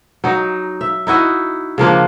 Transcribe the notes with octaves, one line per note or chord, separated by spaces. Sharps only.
F#3 D#4
E5
D#4 E4 F#4 D#5
C#3 F3 A#3 D4